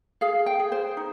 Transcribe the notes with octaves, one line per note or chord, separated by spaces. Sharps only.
G#4 F5
G5
G#4
C5
D#4